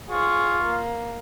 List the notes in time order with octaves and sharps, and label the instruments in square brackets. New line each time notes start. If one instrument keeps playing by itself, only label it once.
[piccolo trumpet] F4 [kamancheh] G#4 C#6
[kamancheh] A#3